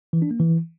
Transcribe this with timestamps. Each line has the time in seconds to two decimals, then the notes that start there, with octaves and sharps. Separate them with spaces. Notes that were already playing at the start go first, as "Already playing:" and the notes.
0.13 E3
0.22 D4
0.31 A#3
0.40 E3